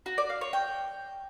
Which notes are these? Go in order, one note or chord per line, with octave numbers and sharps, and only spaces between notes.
F#4
D5
F5
C#5
G5